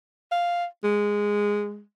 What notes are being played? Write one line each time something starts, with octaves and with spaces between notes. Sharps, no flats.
F5
G#3